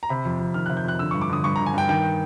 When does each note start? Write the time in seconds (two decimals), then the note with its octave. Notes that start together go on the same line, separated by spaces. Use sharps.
0.03 A#5
0.09 C3 B5
0.25 F2
0.40 F2
0.54 D#3 F6
0.66 F#6
0.69 C3
0.77 G6
0.84 F2 F#6
0.99 D3 E6
1.11 C#6
1.14 G2
1.21 D6
1.29 D3 D#6
1.44 G2 C#6
1.56 A#5
1.59 D3
1.66 G#5
1.74 G2 G5
1.89 D#3 G5